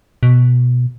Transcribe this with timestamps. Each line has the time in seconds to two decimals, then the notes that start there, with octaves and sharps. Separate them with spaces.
0.23 B2